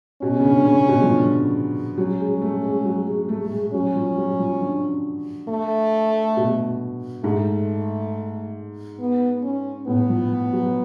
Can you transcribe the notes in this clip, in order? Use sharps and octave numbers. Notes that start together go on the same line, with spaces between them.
B2 C#4
C#3
D3
C#3
B2
F3
D3
F#3 C#4
G#3
A3
G#3
F#3
G#3
A3
A3
G#3
F#3 C#4
F3
F#3
F3
D3
A3
B2
G#2 A3
B3
C#4
A2 B3
F3
F#3